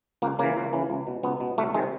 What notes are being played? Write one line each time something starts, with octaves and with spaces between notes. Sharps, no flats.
C#2 A#3
C#3 E3 A#3
C#2
C#3 E3
C#2
B2
C#2 B3
B2
C2 A3
C3 D#3 G#3